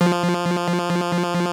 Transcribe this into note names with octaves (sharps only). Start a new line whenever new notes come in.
F3